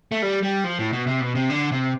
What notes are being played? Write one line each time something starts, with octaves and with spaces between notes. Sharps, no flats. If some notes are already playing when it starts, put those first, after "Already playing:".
A3
G3
G3
F3
A2
B2
C3
B2
C3
D3
C3